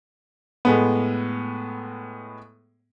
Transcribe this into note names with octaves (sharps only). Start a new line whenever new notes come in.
A2 G#3 B3